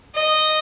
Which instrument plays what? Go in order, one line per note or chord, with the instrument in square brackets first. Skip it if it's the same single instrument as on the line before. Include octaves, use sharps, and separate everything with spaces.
[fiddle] D#5